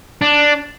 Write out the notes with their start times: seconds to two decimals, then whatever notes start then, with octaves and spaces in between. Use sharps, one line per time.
0.21 D4